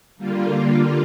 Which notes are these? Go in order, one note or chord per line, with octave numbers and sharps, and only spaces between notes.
D3 G3 A#3 F4